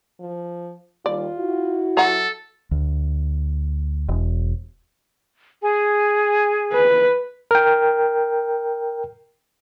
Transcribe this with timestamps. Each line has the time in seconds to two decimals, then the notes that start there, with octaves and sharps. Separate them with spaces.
0.20 F3
1.06 D#2 G3 F4 D5
1.39 E4 F#4
1.97 F#3 A4 F#5 A#5
2.71 D2
4.09 E1
5.62 G#4 G#5
6.73 B4
7.51 A#4 G5